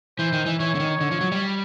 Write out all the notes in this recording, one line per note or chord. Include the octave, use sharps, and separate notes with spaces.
E3 C5
D#3
E3
E3 C#5
D3
D#3
D3
F3
F#3
G3